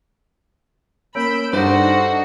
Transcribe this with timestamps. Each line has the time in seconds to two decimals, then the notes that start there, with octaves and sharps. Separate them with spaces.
1.15 A#3 C#4 B5 E6 G6 D7
1.53 G2 D4 D#4 F#4 A4 C5